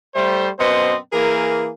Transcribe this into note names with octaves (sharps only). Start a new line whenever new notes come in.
G3 A3 C5
F#2 B2 B3 C4 C5 D#5
E3 A#3 G#4 A#4